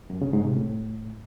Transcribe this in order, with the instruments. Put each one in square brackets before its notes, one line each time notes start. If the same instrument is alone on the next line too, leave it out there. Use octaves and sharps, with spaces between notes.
[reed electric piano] F#2
C#3
G#2
C3
A2